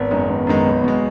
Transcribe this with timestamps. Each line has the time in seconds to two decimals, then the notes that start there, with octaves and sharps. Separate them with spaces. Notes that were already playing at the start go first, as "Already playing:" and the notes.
Already playing: G#1 B3
0.11 F#2 D#3 G#3
0.29 G#1 B3
0.47 F#2 D#3 G#3
0.66 B1
0.84 B2 G#3